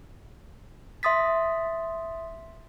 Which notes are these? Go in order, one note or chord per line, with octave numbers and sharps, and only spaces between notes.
E5 C6 D#6 A6 B6